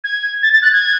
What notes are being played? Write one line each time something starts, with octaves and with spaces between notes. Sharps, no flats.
G#6
A6
A6
F#6
G#6